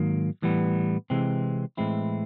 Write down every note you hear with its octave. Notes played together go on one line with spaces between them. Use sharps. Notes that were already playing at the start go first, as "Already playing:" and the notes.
Already playing: G#2 D#3 F#3 A#3
A2 E3 G3 B3
C3 E3 G#3 C4
A2 E3 G#3 C4 E4